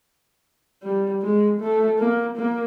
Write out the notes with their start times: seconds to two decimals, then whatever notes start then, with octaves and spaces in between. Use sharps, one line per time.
0.83 G3
1.22 G#3
1.60 A3
1.99 A#3
2.37 A#3